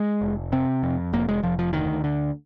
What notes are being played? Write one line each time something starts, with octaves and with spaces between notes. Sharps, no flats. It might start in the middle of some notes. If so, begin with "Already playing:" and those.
Already playing: G#3
F1
C3 C4
F2
F1 A#3
G#3
F1 F3
F3
D2 D#3
D3